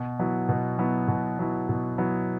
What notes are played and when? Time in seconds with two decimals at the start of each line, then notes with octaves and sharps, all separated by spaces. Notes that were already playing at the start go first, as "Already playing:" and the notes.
Already playing: B2
0.19 F#3 B3 E4
0.49 B2
0.79 F#3 B3 E4
1.08 B2
1.39 F#3 B3 E4
1.69 B2
1.98 F#3 B3 E4